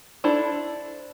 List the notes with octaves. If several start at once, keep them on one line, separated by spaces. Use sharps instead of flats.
D4 E4 A4 C5